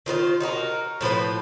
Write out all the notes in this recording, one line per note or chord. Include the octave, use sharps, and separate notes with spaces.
D#3 F4 B4 C5
D#4 F#4 G#4 A#4
A2 F3 B4 C5